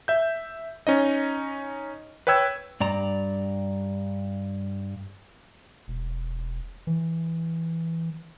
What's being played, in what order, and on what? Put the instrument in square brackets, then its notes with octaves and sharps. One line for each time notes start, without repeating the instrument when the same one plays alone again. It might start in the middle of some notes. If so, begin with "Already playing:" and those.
[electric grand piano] E5 G6
C#4 D#4 D#5
B4 C#5 G5 E6 G#6
[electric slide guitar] G2 D5 A#5
[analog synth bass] E1
E3